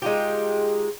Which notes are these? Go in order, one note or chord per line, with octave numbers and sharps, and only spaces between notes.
G#3 D#4 F4 G4